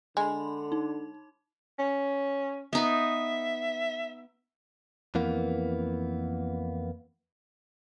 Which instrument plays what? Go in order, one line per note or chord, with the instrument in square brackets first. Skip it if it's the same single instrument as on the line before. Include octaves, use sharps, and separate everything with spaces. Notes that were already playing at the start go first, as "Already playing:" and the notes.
[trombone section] D3 [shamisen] G#3 [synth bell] B5 C6
[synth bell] D#4
[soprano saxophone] C#4
[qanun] B3 D#4 B4 [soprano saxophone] E5
[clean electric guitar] F2 E3 A#3 B3